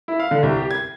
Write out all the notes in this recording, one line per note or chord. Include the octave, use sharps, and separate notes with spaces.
E4
F5
D3
C2
G4
G#6